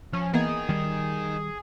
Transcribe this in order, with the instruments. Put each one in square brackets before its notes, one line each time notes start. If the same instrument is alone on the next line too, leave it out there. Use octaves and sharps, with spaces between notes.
[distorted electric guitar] F3 [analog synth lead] C#4
[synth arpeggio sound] E3 A#3 B3 [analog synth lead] G#4 [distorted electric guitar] A#4 D#5
[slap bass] D#3 G3